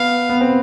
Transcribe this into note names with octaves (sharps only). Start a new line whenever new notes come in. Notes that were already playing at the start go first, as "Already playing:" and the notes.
Already playing: B3 F5
B3
C4